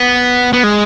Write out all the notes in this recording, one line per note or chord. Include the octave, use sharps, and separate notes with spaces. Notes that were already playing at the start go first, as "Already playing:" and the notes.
Already playing: B3
B3
G#3